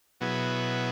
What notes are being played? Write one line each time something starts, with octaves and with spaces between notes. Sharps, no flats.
B2 F#3 B3 E4 G#4